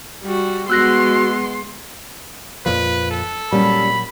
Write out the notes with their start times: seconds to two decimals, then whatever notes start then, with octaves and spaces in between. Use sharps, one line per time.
0.23 G3 F#4
0.70 G#3 B3 F#4 C6 E6 F#6 A#6
2.66 F2 A#2 F3 B4
3.11 A4
3.52 A#2 F#3 G3 C#4 B5